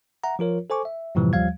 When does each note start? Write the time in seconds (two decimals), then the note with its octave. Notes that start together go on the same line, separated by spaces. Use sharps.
0.24 E5 F#5 A#5
0.39 F3 F4 A#4 C#5
0.70 A4 C5 G#5 C#6 D6
0.85 E5
1.15 F#2 A2 C3 E3 F3 G3
1.33 D#2 F3 G3 F5 G#6